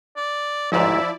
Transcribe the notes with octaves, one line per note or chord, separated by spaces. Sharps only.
D5
A1 D2 G#2 F3 E4 D5 E5